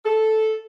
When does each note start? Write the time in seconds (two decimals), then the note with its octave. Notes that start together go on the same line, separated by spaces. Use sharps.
0.05 A4